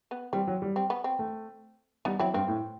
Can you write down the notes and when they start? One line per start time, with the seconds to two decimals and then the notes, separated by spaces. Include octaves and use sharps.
0.11 B3
0.33 G3 C4
0.47 F#3
0.62 G3
0.76 C4
0.90 B3
1.04 C4
1.19 A3
2.05 G3 B3 D#4
2.19 F#3 C4 E4
2.34 G2 C4
2.48 A2